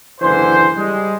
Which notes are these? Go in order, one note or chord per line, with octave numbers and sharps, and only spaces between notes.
F#1 D3 E3 C5
G3 G#3